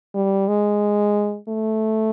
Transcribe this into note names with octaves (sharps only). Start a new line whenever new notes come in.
G3
G#3
A3